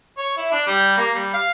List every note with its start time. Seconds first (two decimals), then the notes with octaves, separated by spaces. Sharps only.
0.17 C#5
0.37 E4
0.51 D4
0.67 G3
0.97 A#3
1.14 G3
1.33 F5